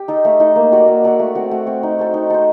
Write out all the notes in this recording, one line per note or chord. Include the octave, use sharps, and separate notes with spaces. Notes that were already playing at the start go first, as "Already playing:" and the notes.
Already playing: G4
D#4 A4 D#5
A3
D#4 A4 D#5
A#3
F#4 A4 D5
A#3
F#4 A4 D5
A3
C4 F#4
A3
C4 F#4
D#4
A4 C5
D#4
A4 C5